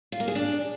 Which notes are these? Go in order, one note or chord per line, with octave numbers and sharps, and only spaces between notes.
F4
A#3
G#4
D4